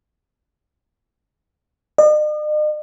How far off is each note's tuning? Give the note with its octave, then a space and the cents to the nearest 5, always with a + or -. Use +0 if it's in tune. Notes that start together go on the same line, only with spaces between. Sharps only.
D#5 -45